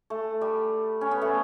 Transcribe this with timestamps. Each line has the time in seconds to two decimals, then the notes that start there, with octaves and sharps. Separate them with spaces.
0.10 A3
0.41 G3
1.01 C#4
1.11 B3
1.21 A3